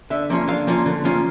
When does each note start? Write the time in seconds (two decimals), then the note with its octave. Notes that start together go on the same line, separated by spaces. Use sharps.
0.10 D3 E5
0.30 F3 A#3 C#4 F4
0.48 D3 F5
0.67 F3 A#3 C#4 F4
0.86 D3
1.05 F3 A#3 C#4 F4